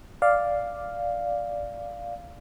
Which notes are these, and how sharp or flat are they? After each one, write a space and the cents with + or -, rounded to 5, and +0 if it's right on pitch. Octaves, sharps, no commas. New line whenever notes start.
D5 +0 F5 +0